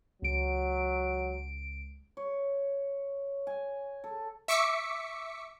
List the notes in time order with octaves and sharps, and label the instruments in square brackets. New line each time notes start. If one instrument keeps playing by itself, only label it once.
[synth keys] C#2 D7 [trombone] F#3
[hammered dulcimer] C#5
G#5
A4
[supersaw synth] E5 C#6 D6 B6 C#7